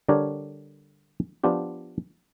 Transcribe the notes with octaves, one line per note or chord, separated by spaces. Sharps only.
D3 G3 D4 G4 A#4 C#5
F3 B3 D4 F4 G4